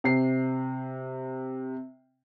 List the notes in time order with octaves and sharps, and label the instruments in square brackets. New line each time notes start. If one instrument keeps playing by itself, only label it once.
[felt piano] C3 C7